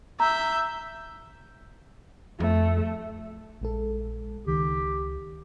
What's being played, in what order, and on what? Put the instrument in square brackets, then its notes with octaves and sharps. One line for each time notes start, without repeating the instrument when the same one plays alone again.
[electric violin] E5 G6 [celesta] A#5
[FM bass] F2 [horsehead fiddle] A3
[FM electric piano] A#1 G#3 A4
[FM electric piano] C#2 D#3 [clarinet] G4